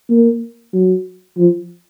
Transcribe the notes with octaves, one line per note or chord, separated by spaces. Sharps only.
A#3
F#3
F3